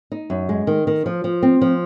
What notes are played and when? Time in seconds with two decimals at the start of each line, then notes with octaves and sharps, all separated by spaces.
0.12 D#4
0.30 F#2
0.49 G#3
0.67 D#3
0.87 D#3
1.06 F3
1.24 F3
1.43 C4
1.61 F3